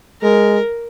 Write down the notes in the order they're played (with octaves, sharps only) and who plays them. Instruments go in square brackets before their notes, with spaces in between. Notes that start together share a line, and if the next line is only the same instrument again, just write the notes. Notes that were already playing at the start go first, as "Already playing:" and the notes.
[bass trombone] G#3 [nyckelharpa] A#4